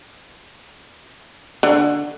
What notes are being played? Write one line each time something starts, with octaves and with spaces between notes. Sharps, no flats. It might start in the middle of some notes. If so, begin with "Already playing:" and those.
D3